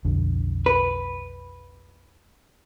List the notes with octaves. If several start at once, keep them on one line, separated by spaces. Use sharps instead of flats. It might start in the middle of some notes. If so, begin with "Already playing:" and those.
B1 F2 D3
B4